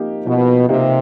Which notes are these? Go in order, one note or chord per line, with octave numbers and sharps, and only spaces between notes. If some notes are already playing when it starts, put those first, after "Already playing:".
Already playing: F3 A#3 D#4 G4
B2 F3
C3 A#3 D#4 G4